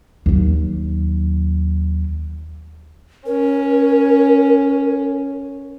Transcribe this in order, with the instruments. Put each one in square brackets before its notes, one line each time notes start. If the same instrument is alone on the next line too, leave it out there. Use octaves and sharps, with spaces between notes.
[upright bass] D#2 F#3
[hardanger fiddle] C#4 [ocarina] A#4